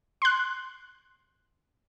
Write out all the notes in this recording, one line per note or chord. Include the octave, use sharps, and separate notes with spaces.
C6 F#6